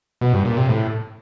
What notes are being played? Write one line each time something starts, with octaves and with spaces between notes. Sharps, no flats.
B2
G2
A#2
C3
A2